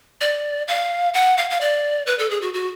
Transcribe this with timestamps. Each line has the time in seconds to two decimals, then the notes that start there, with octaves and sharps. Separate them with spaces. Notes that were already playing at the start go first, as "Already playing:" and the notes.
0.21 D5
0.68 F5
1.14 F#5
1.38 F5
1.50 F5
1.61 D5
2.07 B4
2.19 A4
2.30 G#4
2.42 F#4
2.54 F#4